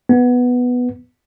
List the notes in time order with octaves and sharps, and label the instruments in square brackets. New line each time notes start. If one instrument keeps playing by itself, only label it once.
[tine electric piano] B3